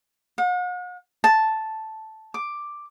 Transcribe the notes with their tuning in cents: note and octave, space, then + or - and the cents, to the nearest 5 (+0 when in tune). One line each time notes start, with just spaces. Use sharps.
F#5 -45
A5 -5
D6 +5